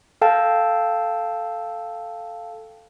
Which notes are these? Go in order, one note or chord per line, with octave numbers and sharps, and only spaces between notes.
A4 F5 G5 A5